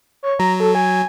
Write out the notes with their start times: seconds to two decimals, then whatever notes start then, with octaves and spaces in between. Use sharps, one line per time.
0.23 C#5
0.39 F#3 A#5
0.60 A4
0.75 G#5